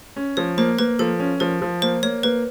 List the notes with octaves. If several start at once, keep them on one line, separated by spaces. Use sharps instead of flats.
C#4
F3 C#5
A#3 C5
A#3 B4
F3 A4
C#4
F3 A#4
F3
A#3 C5
A#3 C#5
A#3 B4